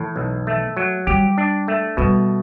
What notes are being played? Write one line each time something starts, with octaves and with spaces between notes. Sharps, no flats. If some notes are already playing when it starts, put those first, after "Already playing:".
Already playing: A2 E3
B1
A3
F#3
G3 G4
D4
A3
B2 G3